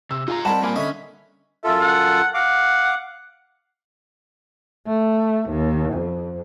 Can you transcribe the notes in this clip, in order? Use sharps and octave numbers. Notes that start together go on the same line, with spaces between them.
C3 E6
D#4 F4 G#4 A#5
G3 C4 A#4 D#5 F#5 A5 B5
A#3 F4 A#4 G#5 B5
D3 C#4 D#5 E5 B5
F#2 F4 A4 E5
F#5
F5 F#5 D6
A3
D#2
F2